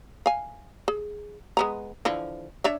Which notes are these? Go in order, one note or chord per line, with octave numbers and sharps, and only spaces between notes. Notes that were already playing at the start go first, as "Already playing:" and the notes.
F5 G#5
G#4
G#3 B3 A#5
D3 E3 F3
D4 C#5 E5